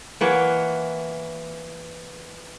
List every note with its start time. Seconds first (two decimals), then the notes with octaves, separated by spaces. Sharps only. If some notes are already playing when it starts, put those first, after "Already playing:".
0.21 E3 A#3 C#5 F#5